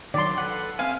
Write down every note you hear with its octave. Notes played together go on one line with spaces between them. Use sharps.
D#3 F#3 D5 C6
A4 B4 F#5
C4 F5 G#5